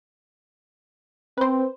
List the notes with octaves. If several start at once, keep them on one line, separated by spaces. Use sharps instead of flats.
C4 B4 C5